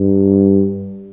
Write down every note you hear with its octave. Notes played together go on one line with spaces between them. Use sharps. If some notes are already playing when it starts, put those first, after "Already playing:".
Already playing: G2